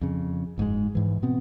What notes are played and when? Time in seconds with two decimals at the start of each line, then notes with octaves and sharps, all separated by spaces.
0.01 F2 C#3
0.58 F#1 G#2 C#3 G#3
0.95 G#2 E3
1.22 B2 B3 C4